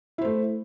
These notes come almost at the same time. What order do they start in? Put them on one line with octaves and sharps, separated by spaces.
E4 C5 A3